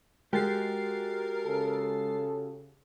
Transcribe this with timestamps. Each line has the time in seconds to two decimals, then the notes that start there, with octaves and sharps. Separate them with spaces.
0.33 G#3 F#4 G4 A#4 A6 C7
1.43 C#3 A4